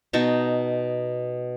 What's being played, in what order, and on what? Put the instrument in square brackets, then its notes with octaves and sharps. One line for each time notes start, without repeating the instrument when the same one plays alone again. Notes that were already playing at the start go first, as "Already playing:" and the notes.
[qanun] B2 D#4 A5 C#6